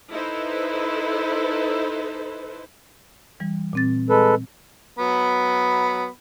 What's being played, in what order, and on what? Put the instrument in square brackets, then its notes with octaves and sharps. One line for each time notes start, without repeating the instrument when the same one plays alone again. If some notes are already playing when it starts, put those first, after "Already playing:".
[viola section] D#4 E4 A4 B4 C5
[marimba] E3 G3
A#2 C4 A6
[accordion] G#3 A4 B4
[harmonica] F#3 B3 B5